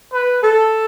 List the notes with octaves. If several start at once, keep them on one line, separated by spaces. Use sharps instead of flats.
B4
A4